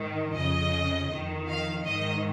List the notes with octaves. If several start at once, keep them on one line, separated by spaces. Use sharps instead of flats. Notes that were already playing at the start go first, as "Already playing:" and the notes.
Already playing: G#2 D#3
F2 C#3 D#5
F2 D#3
F5
G#2 D#3 D#5